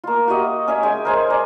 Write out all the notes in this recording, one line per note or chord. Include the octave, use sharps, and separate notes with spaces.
A#3 F4
F#4 G4 D#5 E5
C#4 D#5 E5 G#5
G#3 G5 G#5
A#4 C5 G#5
D5 A#5